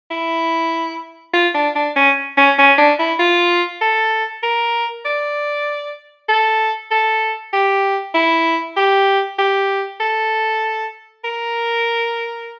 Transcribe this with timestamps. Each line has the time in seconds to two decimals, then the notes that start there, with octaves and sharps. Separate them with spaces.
0.11 E4
1.34 F4
1.55 D4
1.76 D4
1.96 C#4
2.37 C#4
2.58 C#4
2.78 D4
2.99 E4
3.20 F4
3.81 A4
4.43 A#4
5.05 D5
6.29 A4
6.91 A4
7.53 G4
8.14 E4
8.77 G4
9.39 G4
10.00 A4
11.24 A#4